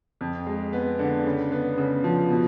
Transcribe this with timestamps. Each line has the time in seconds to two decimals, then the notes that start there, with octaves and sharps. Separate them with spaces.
0.21 F2
0.47 G#3
0.73 B3
0.99 D3
1.26 C#3
1.52 B3
1.78 C#3
2.04 F3
2.30 B2